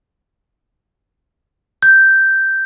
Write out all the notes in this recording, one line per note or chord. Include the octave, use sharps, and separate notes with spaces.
G6